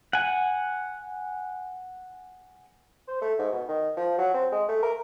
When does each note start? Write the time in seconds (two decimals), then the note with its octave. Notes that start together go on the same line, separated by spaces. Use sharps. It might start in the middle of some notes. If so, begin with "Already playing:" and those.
0.13 F#5 G#5
3.08 C5
3.21 A3
3.39 G#2
3.52 B2
3.68 D#3
3.97 F3
4.18 F#3
4.34 C4
4.52 G#3
4.69 A3
4.83 A#4